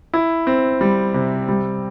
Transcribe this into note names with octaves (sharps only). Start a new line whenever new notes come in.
E4
C4
G3
C3
G3